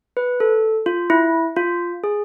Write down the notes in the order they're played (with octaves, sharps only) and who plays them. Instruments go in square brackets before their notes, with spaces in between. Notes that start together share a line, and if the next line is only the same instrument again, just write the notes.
[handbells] B4
A4
F4
E4
F4
G#4